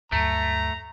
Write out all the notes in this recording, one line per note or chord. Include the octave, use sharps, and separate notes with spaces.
D2 G2 F#3 A3 A#5